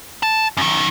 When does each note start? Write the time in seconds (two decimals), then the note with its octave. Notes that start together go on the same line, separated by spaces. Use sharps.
0.23 A5
0.57 F#2 D#3